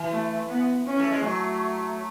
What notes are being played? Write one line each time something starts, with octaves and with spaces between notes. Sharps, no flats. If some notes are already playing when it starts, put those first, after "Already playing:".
Already playing: E3
A3
B3
C#4
A3
G#3
F#3 A3